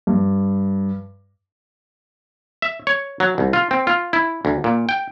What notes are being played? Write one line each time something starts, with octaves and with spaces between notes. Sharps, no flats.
G2
E5
C#5
F#3
C2
F4
C4
F4
E4
D2
A#2
G5